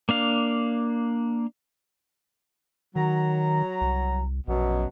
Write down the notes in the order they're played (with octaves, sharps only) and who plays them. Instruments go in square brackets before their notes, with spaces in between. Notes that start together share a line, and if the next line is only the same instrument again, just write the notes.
[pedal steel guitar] A#3 D4 F5
[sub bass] D#3 [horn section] F#3 A#5
[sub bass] C2
[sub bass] A#1 [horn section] F#2 B2 F#3